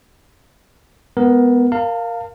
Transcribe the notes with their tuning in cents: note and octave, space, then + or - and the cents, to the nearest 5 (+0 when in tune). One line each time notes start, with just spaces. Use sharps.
G#3 +0 B3 +0 A#4 +15
A#4 +0 F5 +0 A5 +40